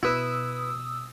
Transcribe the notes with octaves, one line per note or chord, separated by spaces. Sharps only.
B2 E4 B4 D#6 E6